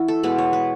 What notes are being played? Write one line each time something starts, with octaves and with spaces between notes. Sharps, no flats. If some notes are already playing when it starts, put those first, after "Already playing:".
Already playing: E3 E4 F#4
A4
B2 G#3 B3 B4
C#5
B4